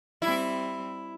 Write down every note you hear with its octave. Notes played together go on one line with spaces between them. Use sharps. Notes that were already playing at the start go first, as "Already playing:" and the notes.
G3 C4 E4